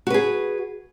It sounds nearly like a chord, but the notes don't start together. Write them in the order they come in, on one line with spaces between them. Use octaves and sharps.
F#4 B4 G#4